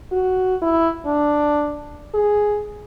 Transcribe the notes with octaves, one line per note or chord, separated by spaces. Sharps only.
F#4
E4
D4
G#4